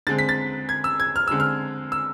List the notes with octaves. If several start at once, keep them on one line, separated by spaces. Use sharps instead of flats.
D3 G#3 C4 A6
B6
A6
G#6
E6
G#6
F6
D3 G#3 C4 E6
F6
E6